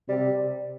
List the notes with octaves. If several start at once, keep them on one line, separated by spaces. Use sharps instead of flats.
C3 G3